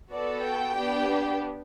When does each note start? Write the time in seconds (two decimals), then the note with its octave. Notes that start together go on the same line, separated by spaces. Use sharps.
0.11 B3 F#4 A4 D5
0.43 G5
0.76 B3 D4 G4